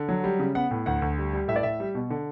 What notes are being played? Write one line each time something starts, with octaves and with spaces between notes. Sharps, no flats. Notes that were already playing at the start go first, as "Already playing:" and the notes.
Already playing: D3
F#3
G3
C#3
B3 F#5
A2
D2 F#5
D2
G3
G3
A2 E5
D5
A2 E5
G3
B2
D3